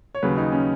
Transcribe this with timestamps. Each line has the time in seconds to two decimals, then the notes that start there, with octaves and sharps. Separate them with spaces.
0.15 C#5
0.23 D#2 C#3 F#3 B4
0.37 D#4
0.52 C#4